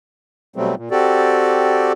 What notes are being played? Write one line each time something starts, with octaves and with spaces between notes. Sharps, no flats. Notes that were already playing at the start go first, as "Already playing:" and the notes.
B2 F#3 G3 A3 C4
A#2
C4 F#4 G4 A4 D5